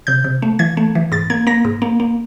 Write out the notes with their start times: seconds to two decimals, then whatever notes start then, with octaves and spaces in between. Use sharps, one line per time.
0.07 C3 G6
0.24 C3
0.42 A3
0.59 E3 G#6
0.77 A3
0.95 E3
1.12 G#2 A6
1.30 A#3 G#6
1.47 A#3 A#6
1.65 G#2
1.82 A#3
2.00 A#3